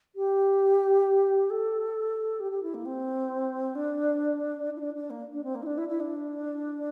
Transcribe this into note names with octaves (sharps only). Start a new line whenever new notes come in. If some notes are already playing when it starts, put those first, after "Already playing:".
G4
A4
G4
G4
E4
A#3
C4
D4
E4
D4
D4
A#3
D4
C4
A#3
E4
D4
E4
E4
D4